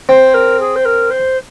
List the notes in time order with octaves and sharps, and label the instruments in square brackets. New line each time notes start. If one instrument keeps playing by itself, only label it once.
[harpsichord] C4 [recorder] C5
[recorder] A#4
G#4
C5
A#4
C5